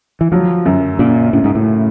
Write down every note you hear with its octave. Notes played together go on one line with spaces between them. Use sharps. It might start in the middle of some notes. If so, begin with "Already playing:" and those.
E3
F3 F#3
F#2
A#2 C#3
A2 C#3
G#2
A2